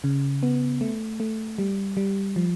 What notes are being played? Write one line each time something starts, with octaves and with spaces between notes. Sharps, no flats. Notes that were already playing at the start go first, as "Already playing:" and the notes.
C#3
B3
A3
A3
G3
G3
F3